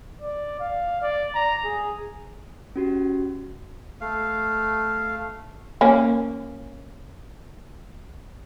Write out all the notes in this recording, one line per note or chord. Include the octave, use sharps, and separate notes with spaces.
D5
F5
D5
A#5
G#4
C#4 F#4 G4
A3 F5
A#3 C#4